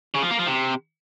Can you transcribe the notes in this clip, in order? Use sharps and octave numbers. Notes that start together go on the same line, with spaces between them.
C#3
F3
A#3
F3
C3